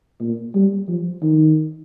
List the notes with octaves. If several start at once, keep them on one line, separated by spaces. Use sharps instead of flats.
A#2
G3
F3
D#3